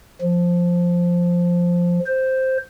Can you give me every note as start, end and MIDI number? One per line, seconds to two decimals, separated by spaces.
0.22 2.00 53
2.06 2.57 72